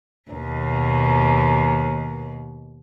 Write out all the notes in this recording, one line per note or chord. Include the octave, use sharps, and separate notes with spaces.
D#2 B2